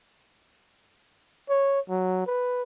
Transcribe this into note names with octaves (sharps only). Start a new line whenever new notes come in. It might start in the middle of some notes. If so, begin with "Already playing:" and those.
C#5
F#3
B4